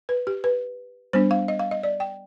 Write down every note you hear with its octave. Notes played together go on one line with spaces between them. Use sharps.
B4
G4
B4
G3 B3 D4 C5
F5
D#5
F5
D#5
D5
G5